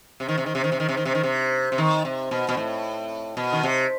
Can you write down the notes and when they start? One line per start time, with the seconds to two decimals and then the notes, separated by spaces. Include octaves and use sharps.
0.20 C3
0.29 D#3
0.38 C3
0.46 D#3
0.55 C3
0.64 D#3
0.72 C3
0.80 D#3
0.89 C3
0.97 D#3
1.05 C3
1.15 D#3
1.23 C3
1.72 C3
1.78 D#3
2.05 C3
2.31 B2
2.49 B2
2.57 A2
3.37 B2
3.52 D#3
3.63 C3